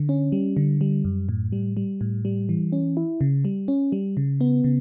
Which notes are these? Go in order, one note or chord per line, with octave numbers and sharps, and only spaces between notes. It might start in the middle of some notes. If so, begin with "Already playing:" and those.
Already playing: D3
C#4
G3
D3
G3
F#2
A2
G3
G3
A2
G3
E3
C#4
E4
C#3
G3
C#4
G3
C#3
B3
C#3